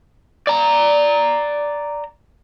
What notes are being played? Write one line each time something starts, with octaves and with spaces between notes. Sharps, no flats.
D5 A#5